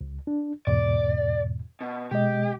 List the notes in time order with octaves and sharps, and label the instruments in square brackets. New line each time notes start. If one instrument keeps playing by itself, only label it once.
[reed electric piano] C#2
D4
[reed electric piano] E2 G#2 B2 [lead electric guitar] D5
[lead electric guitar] B2
[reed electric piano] B2 G#3 D#5 [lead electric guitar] G4